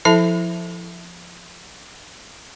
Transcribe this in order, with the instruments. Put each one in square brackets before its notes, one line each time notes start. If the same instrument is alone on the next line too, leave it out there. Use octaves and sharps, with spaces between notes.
[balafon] F3 E4 A4 E5 A5